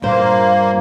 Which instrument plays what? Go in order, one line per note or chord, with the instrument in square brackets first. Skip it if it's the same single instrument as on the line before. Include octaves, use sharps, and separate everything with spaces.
[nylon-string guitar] G2 A#2 C5 [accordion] A#3